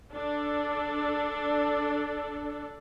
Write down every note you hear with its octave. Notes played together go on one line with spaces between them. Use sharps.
D4 A4